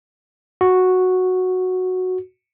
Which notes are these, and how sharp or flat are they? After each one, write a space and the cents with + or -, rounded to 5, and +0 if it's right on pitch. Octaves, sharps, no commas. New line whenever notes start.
F#4 -5